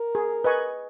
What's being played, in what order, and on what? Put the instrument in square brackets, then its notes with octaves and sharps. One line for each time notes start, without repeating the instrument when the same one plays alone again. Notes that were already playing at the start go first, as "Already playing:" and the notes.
Already playing: [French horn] A#4
[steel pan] G#4
B4 D#5 G#5 C#6